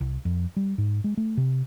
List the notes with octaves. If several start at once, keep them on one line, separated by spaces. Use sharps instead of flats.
C2
F2
G3
G#2
G#3
A3
C3